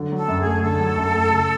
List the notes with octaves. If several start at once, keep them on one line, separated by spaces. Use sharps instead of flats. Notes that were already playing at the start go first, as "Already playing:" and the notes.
Already playing: D3 F#3
F#3
A4
F#2
G#4
A3
D3 A4
F#3
F#2
A3
C#3